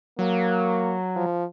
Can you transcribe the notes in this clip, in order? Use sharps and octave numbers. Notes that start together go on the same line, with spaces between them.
F#3 A#3
F3